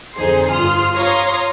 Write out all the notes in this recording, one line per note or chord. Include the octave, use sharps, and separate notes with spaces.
F2 D3 D#4 G#4 C5 C6
G2 F4 C6 D#6 F6
C#5 F5 A#5 C6 D#6